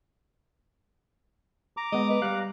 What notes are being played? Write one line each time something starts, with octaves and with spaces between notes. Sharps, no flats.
A#5 D6
G#3 B3 D#5
B4
G3 F5 F#6